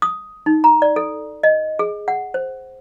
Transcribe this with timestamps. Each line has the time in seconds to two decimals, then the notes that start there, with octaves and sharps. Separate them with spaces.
0.02 D#6
0.46 D#4
0.64 A#5
0.82 D5
0.96 A4
1.43 D#5
1.79 G#4
2.08 F#5
2.34 C5